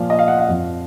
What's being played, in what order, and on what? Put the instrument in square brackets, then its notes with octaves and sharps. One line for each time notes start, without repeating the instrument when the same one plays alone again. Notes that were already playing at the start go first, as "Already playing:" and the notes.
Already playing: [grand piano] A#2 F3 F5
D#5
F5
F#5
F5
F2 F3